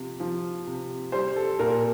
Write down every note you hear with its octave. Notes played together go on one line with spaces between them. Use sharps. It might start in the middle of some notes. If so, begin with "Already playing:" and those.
Already playing: C3 F3
F3
C3
G3 C5
A4
A#2 A#4